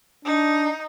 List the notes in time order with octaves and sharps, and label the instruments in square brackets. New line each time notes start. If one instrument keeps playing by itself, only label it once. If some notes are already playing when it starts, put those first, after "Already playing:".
[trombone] D4 [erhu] D#4